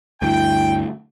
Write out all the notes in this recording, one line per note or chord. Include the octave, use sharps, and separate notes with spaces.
D2 G2 E4 G5